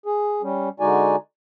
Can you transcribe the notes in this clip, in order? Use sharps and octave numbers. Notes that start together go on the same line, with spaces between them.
G#4
G3 C#4
D3 G#3 D#4 F#4 D5 G#5